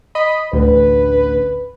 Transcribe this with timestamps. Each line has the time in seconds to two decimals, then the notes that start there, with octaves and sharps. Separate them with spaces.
0.15 D#5 B5
0.53 A1 D2 B4